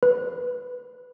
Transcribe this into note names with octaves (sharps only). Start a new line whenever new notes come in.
B4